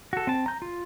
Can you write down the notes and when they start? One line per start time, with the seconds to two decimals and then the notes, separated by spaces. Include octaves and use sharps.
0.13 F#4 A4
0.27 C4 A5
0.46 A#5 G6
0.62 F4